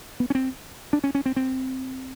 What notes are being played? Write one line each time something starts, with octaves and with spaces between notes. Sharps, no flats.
B3
C#4
C4
D4
C#4
C#4
C4
C4